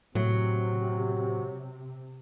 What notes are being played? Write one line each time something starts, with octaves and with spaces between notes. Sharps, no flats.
A2 C3 F#3